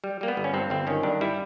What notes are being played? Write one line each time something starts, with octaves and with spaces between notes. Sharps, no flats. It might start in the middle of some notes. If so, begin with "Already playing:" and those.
G3
G3 A#3
B3
G1
C#4
G2 C4
G1 C4
D#3 C#4
G2 D4
G3 E4